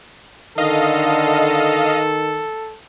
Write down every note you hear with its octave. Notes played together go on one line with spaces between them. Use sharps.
D3 D#3 A4 D#5 F5